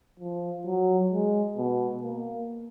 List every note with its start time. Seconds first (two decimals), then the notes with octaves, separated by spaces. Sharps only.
0.20 F3
0.66 F#3
1.11 G#3
1.57 B2
2.03 A#3